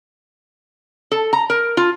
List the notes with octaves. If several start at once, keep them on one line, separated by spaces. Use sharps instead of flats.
A4
A#5
A#4
F4